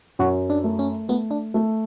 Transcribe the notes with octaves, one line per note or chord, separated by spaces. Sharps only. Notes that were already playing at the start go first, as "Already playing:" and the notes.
F#2 F#4
D4
A3
C#4
A3 B3
D4
A3